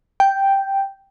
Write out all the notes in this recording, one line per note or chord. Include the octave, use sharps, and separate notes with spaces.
G5